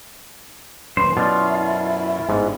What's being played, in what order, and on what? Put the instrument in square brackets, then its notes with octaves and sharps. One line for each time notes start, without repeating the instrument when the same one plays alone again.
[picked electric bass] D#1 F#2 [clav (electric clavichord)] B4 [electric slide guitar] C5
[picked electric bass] F#2 [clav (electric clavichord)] B2 D5 [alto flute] E4 [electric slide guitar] F4
[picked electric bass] G1 [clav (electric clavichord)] G#2